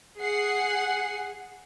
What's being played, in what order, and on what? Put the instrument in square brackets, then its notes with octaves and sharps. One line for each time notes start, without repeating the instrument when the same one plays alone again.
[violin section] G#4 F#5 C7